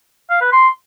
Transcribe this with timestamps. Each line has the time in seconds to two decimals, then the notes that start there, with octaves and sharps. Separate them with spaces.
0.30 F5
0.41 B4
0.52 C6